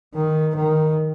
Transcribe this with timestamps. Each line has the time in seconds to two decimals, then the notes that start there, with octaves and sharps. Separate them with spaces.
0.15 D#3
0.56 D#3